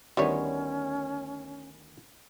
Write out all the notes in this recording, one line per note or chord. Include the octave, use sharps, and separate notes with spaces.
D2 D#3 G3 B3 C#4 E4 C#5